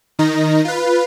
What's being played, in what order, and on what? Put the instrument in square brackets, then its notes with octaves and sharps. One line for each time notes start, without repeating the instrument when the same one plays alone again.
[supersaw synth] D#3 D#4 A#6
F4 B4